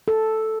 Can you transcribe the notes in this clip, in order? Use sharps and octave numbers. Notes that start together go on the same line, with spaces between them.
A4